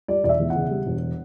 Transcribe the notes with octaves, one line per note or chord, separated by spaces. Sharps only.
G3 D5
E1 D5
E5
E2
F#5
C#3
G3
E1